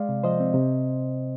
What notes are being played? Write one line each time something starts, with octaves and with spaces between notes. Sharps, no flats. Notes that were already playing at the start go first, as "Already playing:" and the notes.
Already playing: G#3 D5 F5
C3
F3 C5 D#5
C4
C3